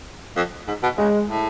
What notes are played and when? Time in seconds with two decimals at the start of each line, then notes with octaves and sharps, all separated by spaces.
0.37 F2
0.67 G#2
0.83 B2
0.98 C#3 G#3
1.28 A2